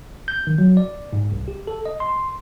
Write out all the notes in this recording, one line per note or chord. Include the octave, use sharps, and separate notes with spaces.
G6
D#3
F#3
D5
G#2
C2
G4
A4
D#5
C6